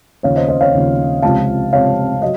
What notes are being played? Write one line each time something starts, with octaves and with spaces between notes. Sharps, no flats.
D#2 C#3 F3 C#5 F5
C5 D#5
C5 D#5
C#5 F5
D#2 C#3 F3
C#2 C3 F3 F5 A5
C#2 C3 F3 C#5 F5
F#3 D#5